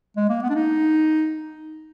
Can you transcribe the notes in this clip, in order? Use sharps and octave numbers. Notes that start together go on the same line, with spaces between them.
G#3
A#3
B3
D4
D#4